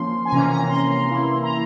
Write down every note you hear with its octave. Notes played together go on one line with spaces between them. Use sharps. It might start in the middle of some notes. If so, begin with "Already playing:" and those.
Already playing: F3 A#3 C#4 C6
G#5
C3 E3 A#3 C#4 A#5
A#5
C6
E3 A#3 E4
A#5